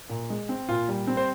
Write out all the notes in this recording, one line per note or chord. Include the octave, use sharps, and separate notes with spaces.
A#2
G#3
C4
A#2 F4
G3
C4
C5